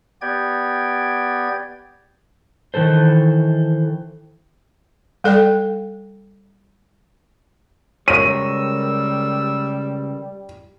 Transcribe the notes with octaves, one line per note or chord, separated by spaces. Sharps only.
B3 G4 D5 G5 G#6
D#3 E3 A4 C5
G3 A4 D5 G5
C#2 G3 A#4 C#5 E6 D#7